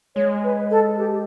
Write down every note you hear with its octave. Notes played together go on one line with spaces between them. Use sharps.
G#3 C#5
B4
A4
G4